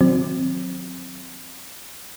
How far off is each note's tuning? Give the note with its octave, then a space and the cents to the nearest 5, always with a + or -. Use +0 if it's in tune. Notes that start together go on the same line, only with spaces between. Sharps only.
D#3 +0 F#3 -30 C4 +0